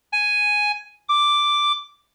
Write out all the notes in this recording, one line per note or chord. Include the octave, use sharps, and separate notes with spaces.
G#5
D6